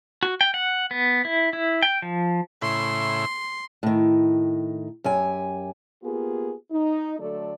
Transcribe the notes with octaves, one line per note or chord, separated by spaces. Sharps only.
F#4
G5
F#5
B3
E4
E4
G5
F3
A2 C#3 E4 C6
A2 D#3
F#2 G4 G#5
A#3 B3 F4 G4 G#4
D#4
D3 F#3 A3 A4 D5